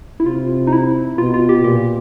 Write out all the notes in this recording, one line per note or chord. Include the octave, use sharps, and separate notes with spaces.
E4
C3 F4
D#4
E4
B2 F4
F4
G4
A#2 G4